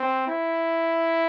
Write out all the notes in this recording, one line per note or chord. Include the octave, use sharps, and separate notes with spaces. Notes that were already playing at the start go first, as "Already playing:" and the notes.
Already playing: C4
E4